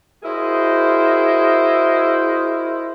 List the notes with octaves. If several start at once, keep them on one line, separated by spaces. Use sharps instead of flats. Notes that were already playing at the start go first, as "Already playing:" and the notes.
E4 F#4 G#4 A#4 C5 D#5